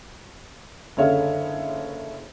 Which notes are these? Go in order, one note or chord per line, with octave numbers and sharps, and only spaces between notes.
F#1 D3 G#4 C#5 E5 F5